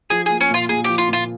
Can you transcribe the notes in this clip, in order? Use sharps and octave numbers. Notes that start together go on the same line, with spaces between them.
F3 G#4
A#3 G#4
C#4
A#2 F4
A#2 G#4
F3 G4
F4
A#2 F4